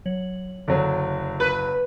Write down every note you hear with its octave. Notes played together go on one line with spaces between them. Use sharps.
F#3 C#5 F#7
F#1 D3 F#3 A4 D5
B4